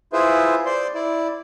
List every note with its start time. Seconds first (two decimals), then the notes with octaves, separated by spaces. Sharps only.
0.13 E4 F4 G#4 B4 C5 E5
0.66 C5 D5 C6
0.95 E4 D5